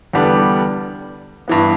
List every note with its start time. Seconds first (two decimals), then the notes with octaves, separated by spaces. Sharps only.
0.13 E2 D3 G3 B3 D4
1.48 G2 E3 B3